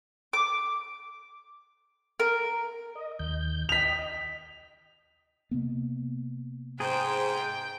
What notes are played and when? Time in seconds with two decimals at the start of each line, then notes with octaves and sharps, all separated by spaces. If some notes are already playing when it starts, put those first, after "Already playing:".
0.33 D6
2.20 A#4
2.95 D#5
3.19 D#2 G6
3.69 D#5 G5 B6 F7
3.96 D#5
5.51 C3 A#3 B3
6.80 G#2 G#4 C5 G5